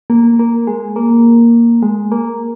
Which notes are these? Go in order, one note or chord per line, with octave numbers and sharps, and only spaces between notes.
A#3
A#3
G#3
A#3
G#3
A#3